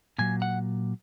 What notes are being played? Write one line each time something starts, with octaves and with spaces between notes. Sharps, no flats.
A#2 F#3 G#5
F#5